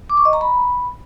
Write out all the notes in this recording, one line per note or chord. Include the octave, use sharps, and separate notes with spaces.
D6
C#6
D#5
A#5
B5